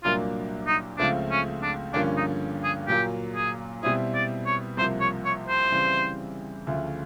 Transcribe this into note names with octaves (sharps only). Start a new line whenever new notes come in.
C2 A#2 F#3 A#3 D4 F4
D#4
C#2 C#3 F3 A3 C4 D4
C#4
D4
G2 D3 F3 A#3 C#4 D4
D#4
G#4
A#2 F#3 A#3 G4
G#4
B2 G3 C4 E4 G#4
D5
C#5
C2 C3 F3 A#3 C5
C#5
C#5
C5
C#3 E3 G3 C4
D2 C#3 F3 A3